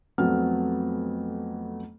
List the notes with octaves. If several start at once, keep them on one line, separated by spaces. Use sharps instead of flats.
F2 F#3 A3 B3 C4 F6